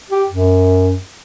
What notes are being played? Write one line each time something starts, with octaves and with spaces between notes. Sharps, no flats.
G4
F#2